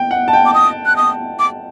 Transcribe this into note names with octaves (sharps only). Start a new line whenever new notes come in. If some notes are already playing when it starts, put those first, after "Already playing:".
Already playing: G5
F#5
A5
G5
D6
D#6
F#6
D#6
D6